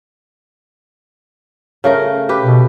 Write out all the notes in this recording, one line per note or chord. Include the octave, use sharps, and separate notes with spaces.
C#3 A3 A#4
G4 B4
B2